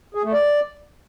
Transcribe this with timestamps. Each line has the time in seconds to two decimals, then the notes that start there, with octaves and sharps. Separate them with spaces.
0.15 G#4
0.24 A3
0.33 D5